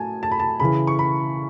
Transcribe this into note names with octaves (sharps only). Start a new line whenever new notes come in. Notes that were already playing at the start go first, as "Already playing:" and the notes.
Already playing: A2 F#3 G#5 A5
A5
B5
A5
C#3 E3 B5
C#6
B5